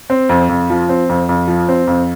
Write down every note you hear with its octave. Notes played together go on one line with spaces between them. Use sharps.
C4
F2
F2
F3
C4
F2
F2
F3
C4
F2